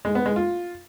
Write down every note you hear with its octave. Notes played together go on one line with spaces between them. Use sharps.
G#3
B3
G#3
F4